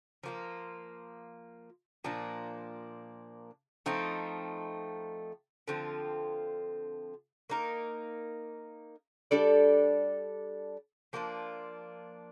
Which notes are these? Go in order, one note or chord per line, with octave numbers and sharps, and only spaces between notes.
F3 A#3 F4
A#2 F3 A#3 D4
F3 A3 C4 D#4
D3 F3 C4 F4
A#3 D#4 A#4
G3 D4 A4 D5
F3 A#3 D4 F4